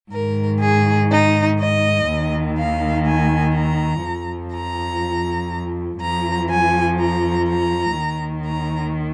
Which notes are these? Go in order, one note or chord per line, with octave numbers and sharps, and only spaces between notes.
G#2 D#3 A#4
G#4
D#4
D#5
D#2 D#3
F5
G#5
A#5
F2 F3
A#5
F2 F3 A#5
G#5
A#5
A#5
D#2 D#3
A#5